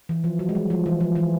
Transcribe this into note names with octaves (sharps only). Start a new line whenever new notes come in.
E3
F3
F#3
G#3
G3
F3
E3
F3
E3